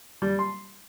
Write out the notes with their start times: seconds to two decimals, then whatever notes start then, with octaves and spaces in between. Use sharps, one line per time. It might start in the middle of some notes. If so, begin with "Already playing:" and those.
0.22 G3
0.39 C6